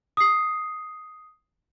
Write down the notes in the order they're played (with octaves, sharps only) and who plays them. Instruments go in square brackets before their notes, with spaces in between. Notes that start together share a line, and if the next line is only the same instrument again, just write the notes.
[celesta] D#6 C7